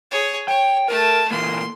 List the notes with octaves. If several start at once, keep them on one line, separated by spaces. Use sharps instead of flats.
G#4 C#5
C#5 G5
A3 A#4 A5
A#2 E3 A#3 C6